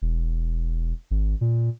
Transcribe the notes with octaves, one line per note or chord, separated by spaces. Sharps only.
E1
G#1
A#2